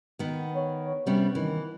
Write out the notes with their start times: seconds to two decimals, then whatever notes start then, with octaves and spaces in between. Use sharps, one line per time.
0.19 D#3 B3
0.55 C#5
1.07 C3 G3 B3 C#4
1.35 D#3 E3